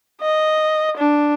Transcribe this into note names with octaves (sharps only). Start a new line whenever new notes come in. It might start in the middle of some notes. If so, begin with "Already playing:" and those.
D#5
D4